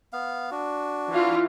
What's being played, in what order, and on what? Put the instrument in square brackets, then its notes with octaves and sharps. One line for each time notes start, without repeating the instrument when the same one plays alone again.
[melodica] B3 F5
D4 F#4
[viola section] E3 E4 F4